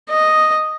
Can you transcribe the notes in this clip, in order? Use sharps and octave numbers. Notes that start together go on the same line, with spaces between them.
D#5